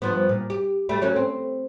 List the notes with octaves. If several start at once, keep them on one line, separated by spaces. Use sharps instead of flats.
G2 F3 B3
A#2
G4
G3 A3
F#3 C#4 A4
C4